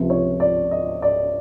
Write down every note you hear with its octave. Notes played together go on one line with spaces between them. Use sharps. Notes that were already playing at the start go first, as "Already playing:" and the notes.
Already playing: C#2 C3 F3
C#5
D5
D#5
D5